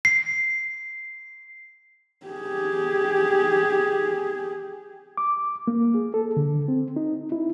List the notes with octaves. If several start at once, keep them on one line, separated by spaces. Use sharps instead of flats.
C7
G4 G#4
D6
A#3
G#4
A4
D3
C4
D#4
E4